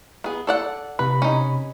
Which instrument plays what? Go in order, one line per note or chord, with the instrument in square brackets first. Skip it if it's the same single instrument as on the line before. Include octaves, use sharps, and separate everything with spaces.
[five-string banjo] B3 G#4
A4 D5 F#5
[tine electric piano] C3 B5 [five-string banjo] B4
[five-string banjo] C#4 D#4